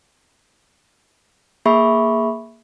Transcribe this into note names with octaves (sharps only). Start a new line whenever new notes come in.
A#3 G#4 E5 B5 C#6